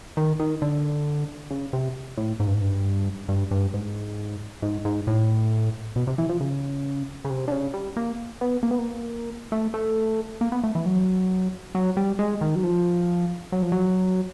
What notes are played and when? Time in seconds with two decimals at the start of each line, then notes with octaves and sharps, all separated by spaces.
0.17 D#3
0.40 D#3
0.62 D3
1.51 C#3
1.73 C3
2.18 A2
2.40 G#2
2.47 G2
2.54 G#2
2.62 G2
3.28 G2
3.51 G2
3.74 G#2
4.62 G#2
4.85 G#2
5.07 A2
5.96 B2
6.07 C3
6.18 E3
6.29 F3
6.41 C#3
7.25 C#3
7.30 C3
7.48 D3
7.52 C#3
7.74 G3
7.97 A#3
8.41 B3
8.63 A#3
8.71 B3
8.78 A#3
9.52 A3
9.74 A3
10.41 A#3
10.52 B3
10.64 A3
10.75 E3
10.86 F#3
11.75 F#3
11.97 G3
12.19 G#3
12.41 D#3
12.55 F#3
12.63 F3
13.52 F#3
13.62 F3
13.72 F#3